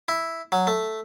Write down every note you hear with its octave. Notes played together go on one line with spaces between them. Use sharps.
E4
F#3
A3